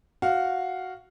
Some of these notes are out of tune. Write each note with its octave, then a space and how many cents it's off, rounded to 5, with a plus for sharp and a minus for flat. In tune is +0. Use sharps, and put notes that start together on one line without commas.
F#4 +0 F5 +0